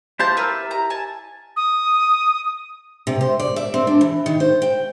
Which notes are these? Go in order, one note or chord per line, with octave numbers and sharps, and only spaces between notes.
E4 G4 C5 F5 A5 G6
A#4 B4 E6
A#5
G#5 A5
D#6
C3
C5
D5
E5
C4
D4
E3
D#3
C5
G5